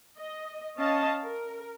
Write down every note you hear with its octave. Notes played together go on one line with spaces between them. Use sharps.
D#5
C#4 D#5 F5 A5
A#4